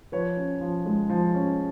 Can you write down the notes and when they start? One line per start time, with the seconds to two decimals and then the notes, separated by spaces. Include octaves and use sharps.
0.12 F3 B4 C#5
0.37 C#4
0.61 F3
0.86 G#3
1.10 F3
1.35 C#4